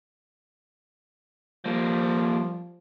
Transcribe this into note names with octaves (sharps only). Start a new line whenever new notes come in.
F3 G3 A#3